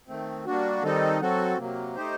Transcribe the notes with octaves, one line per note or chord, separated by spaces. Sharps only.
D#3 A3 C4
G3 A#3 D4 F#4
D#3 G3 C4 D#4 A4
F#3 C4 F#4 A4
C3 F#3 A#3
A3 D#4 G4 C5